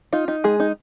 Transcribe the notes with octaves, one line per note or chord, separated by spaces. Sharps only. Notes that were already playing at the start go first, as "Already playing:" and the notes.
D#4 F4
D#4
G#3 G#4
D#4